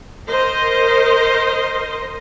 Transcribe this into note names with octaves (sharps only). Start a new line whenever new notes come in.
A#4 C5 D#5